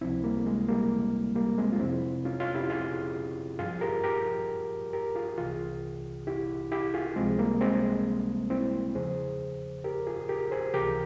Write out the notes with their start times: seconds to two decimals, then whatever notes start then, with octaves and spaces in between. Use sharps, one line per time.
0.01 C#2 C3 F3 C4 E4
0.24 G3 A#3
0.46 G#3
0.69 G3 A#3
1.35 G3 A#3
1.58 G#3 C4
1.72 F4
1.80 F2 C3 F3 C4 E4
2.25 C#4 F4
2.40 C#4 F4
2.55 E4 G4
2.70 F4 G#4
3.59 G2 F3 F4 G#4
3.81 G4 A#4
4.03 G4 A#4
4.93 G4 A#4
5.15 F4 G#4
5.38 C2 C3 E3 F4 G#4
6.27 E4 G4
6.71 E4 G4
6.94 F4 G#4
7.16 C#2 C3 F3 G#3 C4
7.38 G3 A#3
7.61 G#3 C4
8.50 C4 E4
8.95 E2 C#3 F3 G#4 C5
9.84 G4 A#4
10.07 F4 G#4
10.29 G4 A#4
10.52 G#4 C5
10.74 C#2 C3 E3 G4 A#4